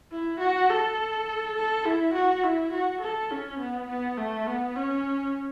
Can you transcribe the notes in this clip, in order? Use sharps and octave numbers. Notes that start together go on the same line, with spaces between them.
E4
F#4
A4
A4
E4
F#4
E4
F#4
A4
C#4
B3
B3
A3
B3
C#4